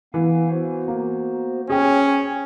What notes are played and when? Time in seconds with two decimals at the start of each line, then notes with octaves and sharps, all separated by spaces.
0.14 E3 B3 F5 G#5
0.50 B3 F#4 C5
0.88 A#3
1.70 C#4 G#4 C#5 G5